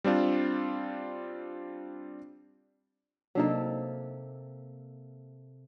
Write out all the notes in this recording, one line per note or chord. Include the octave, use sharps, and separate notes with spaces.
G3 C4 D4 F4
C3 F#3 A#3 D4 D#4 A4